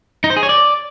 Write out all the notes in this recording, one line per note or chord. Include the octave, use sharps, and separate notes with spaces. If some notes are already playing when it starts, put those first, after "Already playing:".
D#4
C5
G#4
C#5
D5